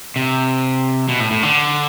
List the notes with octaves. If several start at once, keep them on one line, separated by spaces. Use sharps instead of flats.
C3
B2
A2
A2
D3